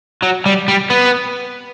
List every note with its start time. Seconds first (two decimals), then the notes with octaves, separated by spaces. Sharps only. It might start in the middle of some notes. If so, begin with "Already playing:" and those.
0.23 F#3
0.46 G3
0.68 G3
0.90 B3